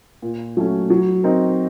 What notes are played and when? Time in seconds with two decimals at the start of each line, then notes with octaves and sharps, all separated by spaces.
0.22 A#2
0.57 F#3 A3 C#4
0.90 F#3
1.24 C4 D#4 A#4